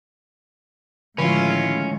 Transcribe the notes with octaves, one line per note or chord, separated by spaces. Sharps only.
A2 D3 D#3 F3 G#3 C#4 E4 F4